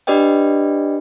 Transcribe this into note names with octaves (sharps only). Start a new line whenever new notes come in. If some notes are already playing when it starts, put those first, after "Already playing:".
D4 G4 B4 D5 D#5 G5